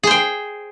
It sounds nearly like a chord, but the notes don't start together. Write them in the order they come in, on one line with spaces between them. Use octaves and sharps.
G#4 C5 G5